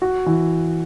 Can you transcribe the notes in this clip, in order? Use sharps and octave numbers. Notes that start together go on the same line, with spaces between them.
F#4
E3